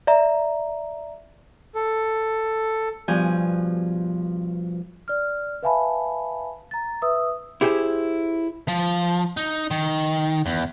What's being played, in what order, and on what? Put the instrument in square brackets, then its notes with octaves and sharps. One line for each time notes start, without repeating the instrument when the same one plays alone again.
[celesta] D5 E5 A#5
[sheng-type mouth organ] A4
[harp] G2 B2 F3 G#5 G6
[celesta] D5 F6
B4 E5 F5 G#5 A5 B5
A#5 A6
B4 E5 D#6 E6
[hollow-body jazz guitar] E4 G4 G#4 C5
[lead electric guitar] F3
D#4
D#3
E2